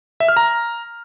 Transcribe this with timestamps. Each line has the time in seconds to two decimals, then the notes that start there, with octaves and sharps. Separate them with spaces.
0.20 E5
0.28 F6
0.37 A#5